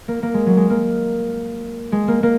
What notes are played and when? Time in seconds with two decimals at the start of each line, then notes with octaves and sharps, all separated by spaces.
0.08 A#3
0.23 A#3
0.34 G#3
0.46 F#3
0.57 G#3
0.70 A#3
1.92 G#3
2.08 A#3
2.23 A#3